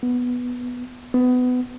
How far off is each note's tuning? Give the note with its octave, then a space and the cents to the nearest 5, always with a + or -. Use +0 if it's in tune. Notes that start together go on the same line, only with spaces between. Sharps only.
B3 -5
B3 +20